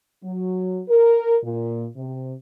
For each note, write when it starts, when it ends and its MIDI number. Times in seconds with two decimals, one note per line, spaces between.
0.24 0.82 54
0.89 1.37 70
1.44 1.86 46
1.96 2.32 48